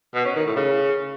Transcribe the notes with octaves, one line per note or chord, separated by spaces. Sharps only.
B2
C#4
D#3
A2
C#3